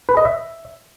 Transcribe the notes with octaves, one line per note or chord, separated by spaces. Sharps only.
B4
D#5
E5